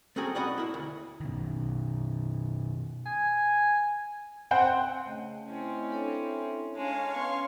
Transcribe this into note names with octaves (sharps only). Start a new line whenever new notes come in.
A3 C4 C#4 F#4 G#4 A#4
B1 F#4 D5 D#5 F#5 B5
A#3 E4
D2
B2 D#3
G#5
C4 C5 F#5 G5
C#3 A3 D#5
C4 C#4 E4
D4 A4 C#5
G#3 C#4 C#5 F5 A5
B3 C6 C#6